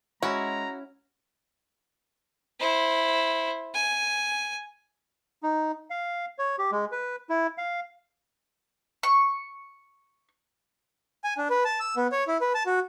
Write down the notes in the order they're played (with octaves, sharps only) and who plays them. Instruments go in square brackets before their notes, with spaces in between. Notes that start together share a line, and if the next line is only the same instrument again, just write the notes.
[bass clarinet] G#3 [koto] C#4 E4 [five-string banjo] F#4 [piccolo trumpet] A#5
[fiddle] E4 C5
G#5
[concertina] D#4
F5
C#5
G4
G#3
B4
E4
F5
[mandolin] C#6
[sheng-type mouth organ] G#5
D4
B4
A5
E6
B3
C#5
E4
B4
A5
F#4